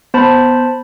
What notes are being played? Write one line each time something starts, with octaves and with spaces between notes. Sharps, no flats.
B3 C5 A5 B5